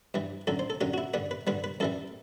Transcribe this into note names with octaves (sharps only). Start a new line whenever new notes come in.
G2 E3 G3
F#2 D3 F#3 A4
C5
A4
F#2 D3 F#3 G4
F#4
E4
G2 D3 G3 B4
B4
G2 D3 G3 B4
B4
F#2 E3 G3 A4